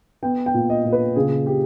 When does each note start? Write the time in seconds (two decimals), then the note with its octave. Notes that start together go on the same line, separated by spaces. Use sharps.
0.23 B3 G5
0.46 G5
0.54 A#2
0.70 D#5
0.85 A#2
0.93 B4
1.16 C#3 G#4
1.46 G4